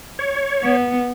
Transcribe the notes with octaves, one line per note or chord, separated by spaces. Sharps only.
C#5
B3